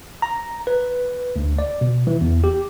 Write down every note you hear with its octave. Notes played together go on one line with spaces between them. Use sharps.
A#5
B4
D2
D5
B2
E3
E2
G4